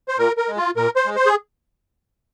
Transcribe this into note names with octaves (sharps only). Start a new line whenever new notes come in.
C5
A#2 A#4
A#4
G#3
F4
A#2 A#4
C5
G#3
C5
G#4